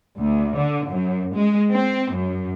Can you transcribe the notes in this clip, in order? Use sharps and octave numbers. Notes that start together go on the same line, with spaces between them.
D2
D3
F#2
G#3
C4
F#2